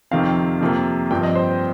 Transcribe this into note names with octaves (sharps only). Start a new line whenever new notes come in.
F2 C3 D#3 C4 F5
F2 C3 F3 A#3
G2 F3 C4 G5
D#5
C5